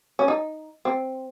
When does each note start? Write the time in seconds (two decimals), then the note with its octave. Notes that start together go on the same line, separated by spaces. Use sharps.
0.19 C#4
0.28 D#4
0.85 C4